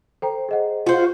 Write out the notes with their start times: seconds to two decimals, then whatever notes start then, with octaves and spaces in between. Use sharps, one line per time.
0.22 A4 C5 G5 A#5
0.49 G#4 D#5 F#5
0.86 F4 F#4 C5